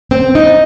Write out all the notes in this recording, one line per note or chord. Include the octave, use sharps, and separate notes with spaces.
C4
D#4